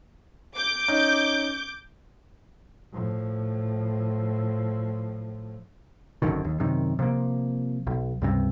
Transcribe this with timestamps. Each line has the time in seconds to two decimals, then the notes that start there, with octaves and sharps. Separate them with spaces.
0.55 D6 G6
0.88 C#4 D#4
2.92 A2 F3
6.22 G#1 F#2 D3 D#3
6.44 D#2
6.60 F#2 C3 D#3
6.99 C3 F3 A#3
7.87 B1
8.22 C#2 G2 C3